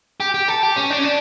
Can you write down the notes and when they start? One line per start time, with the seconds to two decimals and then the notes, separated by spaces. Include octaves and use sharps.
0.20 G4
0.34 G4
0.48 A4
0.63 G4
0.76 C#4
0.90 D4
0.99 C#4
1.04 D4